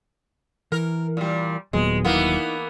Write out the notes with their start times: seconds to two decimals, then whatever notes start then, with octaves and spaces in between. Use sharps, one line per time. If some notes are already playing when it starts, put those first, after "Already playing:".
0.72 E3 A#4
1.17 A#2 G3
1.73 D#1 D#2 A#2 F#3 G#3 B3 G#4
2.05 E3 A#3 B3 D#4 E4